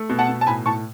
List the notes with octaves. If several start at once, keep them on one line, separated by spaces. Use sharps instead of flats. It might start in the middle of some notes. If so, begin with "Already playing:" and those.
Already playing: A3
B2
F#5 A5
B2
A5
A2 G#5 B5
A2 A5 C#6